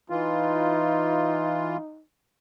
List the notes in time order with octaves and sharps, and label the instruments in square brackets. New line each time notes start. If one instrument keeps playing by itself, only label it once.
[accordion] E3 F4 [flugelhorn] D#4